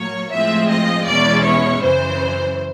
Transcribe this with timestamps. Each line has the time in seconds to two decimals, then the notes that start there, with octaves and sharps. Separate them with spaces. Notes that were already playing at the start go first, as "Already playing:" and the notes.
Already playing: A2 F#3 A#3 C#5
0.31 A2 F3 G#3 C4 F4 E5
0.69 D#5
1.06 E2 B2 G#3 C#4 E4 D5
1.44 C#5
1.82 F#2 C#3 E3 C5